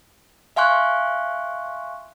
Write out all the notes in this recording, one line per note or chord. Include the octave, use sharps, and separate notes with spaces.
E5 F5 G#5 C6 C#6 F#6